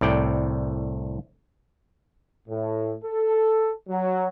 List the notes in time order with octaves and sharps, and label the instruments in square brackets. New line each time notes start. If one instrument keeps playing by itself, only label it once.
[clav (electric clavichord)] C2 A2 D5 G5
[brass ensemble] A2
A4
F#3